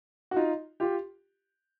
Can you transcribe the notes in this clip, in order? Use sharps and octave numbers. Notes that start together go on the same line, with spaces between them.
F#4
D#4 F4
F4 G4